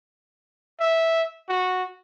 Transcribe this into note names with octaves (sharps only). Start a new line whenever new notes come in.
E5
F#4